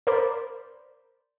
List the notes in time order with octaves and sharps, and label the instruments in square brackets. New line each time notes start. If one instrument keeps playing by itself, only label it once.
[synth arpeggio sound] A#4 C5 D5 B5